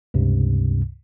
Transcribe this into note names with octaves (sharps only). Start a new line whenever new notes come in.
C#2 G2 C3